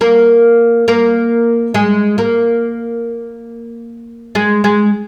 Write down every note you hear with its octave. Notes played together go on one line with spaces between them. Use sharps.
A#3 A#4
A#3 A#4
G#3 G#4
A#3 A#4
G#3 G#4
G#3 G#4